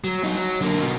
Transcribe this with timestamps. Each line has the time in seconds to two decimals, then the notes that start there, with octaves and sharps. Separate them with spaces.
0.04 F#3
0.24 D#4 F#4
0.36 F#3
0.61 D3 A#3
0.81 B1 B2